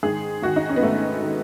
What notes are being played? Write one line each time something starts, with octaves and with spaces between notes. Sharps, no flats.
G#2 D#3 G#4
G#2 D#3 F#4
D#4
C#4
B3
G#2 D#3 A3
D#3